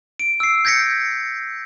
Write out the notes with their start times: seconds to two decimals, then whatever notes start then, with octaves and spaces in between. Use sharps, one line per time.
0.19 D7
0.40 E6 C7
0.65 G6 G#6 A#6 B6 C#7